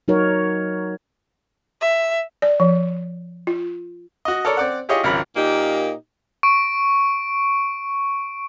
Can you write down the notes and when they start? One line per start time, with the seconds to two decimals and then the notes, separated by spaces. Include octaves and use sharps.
0.08 F#3 D#4 F#4 A#4 C#5
1.81 E5
2.42 D5
2.60 F3
3.47 F4
4.25 F#4 D#5
4.45 A4 A#4 C#5 D5
4.57 C4 D5 F#5
4.89 E4 F4 G4 G#4 C#5 D#5
5.03 G#1 C#2 F#3 A#4 B5
5.36 A#2 A#3 D#4 G4
6.43 C#6 D7